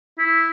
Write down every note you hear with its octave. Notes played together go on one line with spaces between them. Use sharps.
E4